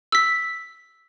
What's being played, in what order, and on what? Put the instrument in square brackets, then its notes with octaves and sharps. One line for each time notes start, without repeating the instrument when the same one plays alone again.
[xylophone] E6 B6